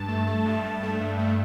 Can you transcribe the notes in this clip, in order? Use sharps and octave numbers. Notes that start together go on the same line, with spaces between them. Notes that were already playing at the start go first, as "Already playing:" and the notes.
Already playing: G2 A5
A3
A3
G2
G2
A3
G2
A3